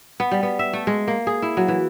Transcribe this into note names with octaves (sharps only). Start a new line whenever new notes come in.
B3
G3
B3
E5
A3
G#3
A#3
G#4
E4
F#3
E3